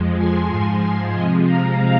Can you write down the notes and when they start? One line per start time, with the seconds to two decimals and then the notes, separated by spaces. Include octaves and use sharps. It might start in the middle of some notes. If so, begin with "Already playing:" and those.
Already playing: F2 F3 G#3
0.17 G#5 C6
0.49 G#2 F3 G#3 G#5 C6
1.12 C3 F3 G#3 D#5 G#5
1.44 F5 A#5